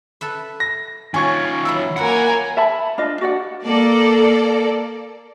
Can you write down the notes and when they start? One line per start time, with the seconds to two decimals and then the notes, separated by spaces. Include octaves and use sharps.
0.21 A4 B4 E5
0.60 A#6
1.14 D#3 C#4 F4 G#5 C#6 G#6
1.65 E3 F#3 E4 E6
1.97 A#3 F#4 A#4 B4 C#5 F#5 G#5
2.57 E5 A5 B5
2.98 D4 F4 D#5
3.21 F#4 D5 F#5
3.65 A#3 A4 D5